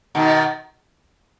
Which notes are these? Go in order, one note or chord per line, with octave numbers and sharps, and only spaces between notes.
B2 D#3